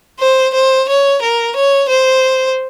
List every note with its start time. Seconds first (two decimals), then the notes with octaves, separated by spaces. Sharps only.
0.20 C5
0.54 C5
0.88 C#5
1.22 A#4
1.56 C#5
1.89 C5